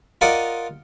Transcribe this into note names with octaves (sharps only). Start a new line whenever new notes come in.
F4 A#4 D5 D#5 F#5